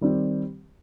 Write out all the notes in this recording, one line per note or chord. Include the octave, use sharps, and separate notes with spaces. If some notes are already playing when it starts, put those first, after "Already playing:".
D#3 G3 C4 G4